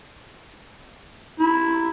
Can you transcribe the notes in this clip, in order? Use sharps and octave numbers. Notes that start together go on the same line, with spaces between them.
E4